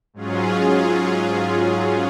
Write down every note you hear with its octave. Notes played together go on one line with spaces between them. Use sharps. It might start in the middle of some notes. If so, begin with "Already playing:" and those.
G#2 F#3 C#4 F4 G#4